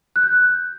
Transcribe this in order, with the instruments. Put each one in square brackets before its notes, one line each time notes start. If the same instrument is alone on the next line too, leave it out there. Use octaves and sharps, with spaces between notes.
[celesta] F#6
G6